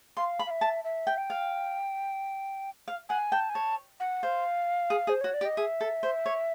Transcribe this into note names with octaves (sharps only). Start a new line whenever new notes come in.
F5 C6
B5
F5
E5
A5
E5
G5
G5
F5
F5
F#5 G#5
G5 A5
G#5
C#5 A5
F#5
C5 F5
G#4
G#4 C5
F#4 C#5
D5
G4
D#5
G#4 E5
A4
C5
C#5